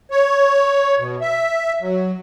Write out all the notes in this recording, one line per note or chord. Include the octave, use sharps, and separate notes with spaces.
C#5
B2
E5
F#3